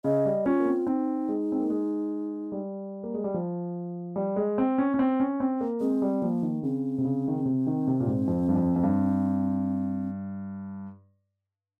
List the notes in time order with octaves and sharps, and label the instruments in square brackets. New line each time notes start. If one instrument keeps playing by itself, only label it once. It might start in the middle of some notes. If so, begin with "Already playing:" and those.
[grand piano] C#3 [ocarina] D#5
[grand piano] G3
[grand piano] C#4 [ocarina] F4
[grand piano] A#3
C4
[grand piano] C4 [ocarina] D#4
[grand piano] G#3
C4
A#3
G#3
G3
A#3
G#3
G3
F3
G3
G#3
C4
C#4
C#4
C4
C#4
C4
A#3
[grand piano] G#3 [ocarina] C4
[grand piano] G3
[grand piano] F3 [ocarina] A#3
[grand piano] D#3
[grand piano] C#3 [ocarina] C4
[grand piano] C3
C#3
D#3
C#3
C3
D#3
C3
A#2
G#2
F2
G2
F2
F2
G2